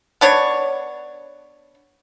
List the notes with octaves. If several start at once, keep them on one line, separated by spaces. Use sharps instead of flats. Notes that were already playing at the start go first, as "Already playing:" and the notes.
B3 D4 C#5